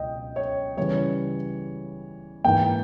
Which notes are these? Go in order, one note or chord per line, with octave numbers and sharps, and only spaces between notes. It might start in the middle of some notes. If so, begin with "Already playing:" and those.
Already playing: C#2 B2 D#5 G5
C#5
C#3 E3 G3 C#5
G#2 E3 A#3 G5